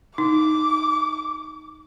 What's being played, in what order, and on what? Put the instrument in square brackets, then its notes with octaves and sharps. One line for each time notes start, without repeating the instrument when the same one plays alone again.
[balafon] D#4 [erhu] D6